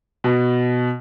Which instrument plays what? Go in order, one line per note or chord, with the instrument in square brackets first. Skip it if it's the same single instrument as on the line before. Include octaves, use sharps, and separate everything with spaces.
[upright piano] B2